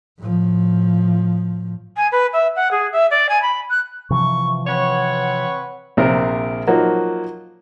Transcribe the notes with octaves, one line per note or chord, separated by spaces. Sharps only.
A2 F3
G#5
B4
E5
F#5
G#4
E5
D5
G#5
B5
F#6
C3 E3 F3 C#6
C4 B4 C#5 F#5
A#1 C3 A#4 C5
F3 F#3 A#3 D#4 F#4